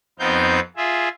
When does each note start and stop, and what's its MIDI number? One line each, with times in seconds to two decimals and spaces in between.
0.19 0.60 41
0.19 0.60 59
0.19 0.60 60
0.19 0.60 63
0.19 0.60 77
0.19 0.60 91
0.77 1.09 65
0.77 1.09 68
0.77 1.09 76